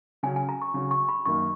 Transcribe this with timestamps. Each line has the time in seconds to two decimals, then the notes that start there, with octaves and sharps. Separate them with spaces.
0.23 C#3 F#3 C#4 F#4 G#5
0.36 G#5
0.49 A#5
0.61 C#6
0.74 C#3 F#3 C#4 F#4
0.91 C#6
1.09 B5
1.25 F#2 D#3 A#3 D#4 C#6